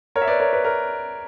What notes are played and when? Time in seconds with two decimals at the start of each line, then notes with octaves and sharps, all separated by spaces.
0.16 A#4 C#5
0.22 E5
0.28 B4 D5
0.40 A#4 C#5
0.53 B4
0.65 A#4